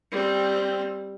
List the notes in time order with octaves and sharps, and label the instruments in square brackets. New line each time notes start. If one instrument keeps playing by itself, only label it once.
[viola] G3 C4